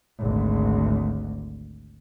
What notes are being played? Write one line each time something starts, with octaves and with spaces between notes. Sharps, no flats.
G#1 D2